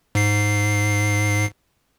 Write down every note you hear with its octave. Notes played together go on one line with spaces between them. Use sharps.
G#2 C7